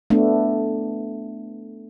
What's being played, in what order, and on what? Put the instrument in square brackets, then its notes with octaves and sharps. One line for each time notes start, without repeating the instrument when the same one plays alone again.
[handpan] A3 B3 D4